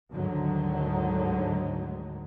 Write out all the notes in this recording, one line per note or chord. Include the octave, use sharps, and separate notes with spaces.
D2 G#2 D3 D#3 F#3